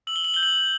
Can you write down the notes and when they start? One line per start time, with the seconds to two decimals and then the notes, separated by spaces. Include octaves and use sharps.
0.07 E6 F#7
0.16 G7
0.25 F#7
0.34 G6 G7
0.43 F#7